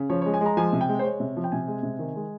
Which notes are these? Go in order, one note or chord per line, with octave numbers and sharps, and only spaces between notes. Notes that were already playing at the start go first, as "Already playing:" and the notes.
Already playing: C#3
F3 C#5
G#3 C#5
G#5
G#3
A#5
F3 G#5
C3
G5
G#3
C5
G#3 C#5
C3
F3
G5
C3 G#5
G#3
C3
D#3
G#3